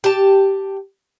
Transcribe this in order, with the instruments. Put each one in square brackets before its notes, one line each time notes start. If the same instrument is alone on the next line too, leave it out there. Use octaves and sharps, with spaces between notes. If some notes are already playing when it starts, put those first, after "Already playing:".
[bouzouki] G4 A5